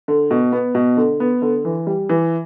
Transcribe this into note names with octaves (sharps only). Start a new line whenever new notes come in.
D3
B2
B3
B2
D3
B3
D3
E3
G3
E3